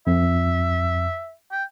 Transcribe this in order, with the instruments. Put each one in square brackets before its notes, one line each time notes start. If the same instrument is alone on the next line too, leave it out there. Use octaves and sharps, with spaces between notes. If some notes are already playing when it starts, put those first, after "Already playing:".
[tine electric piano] F2 [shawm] E5
[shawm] G5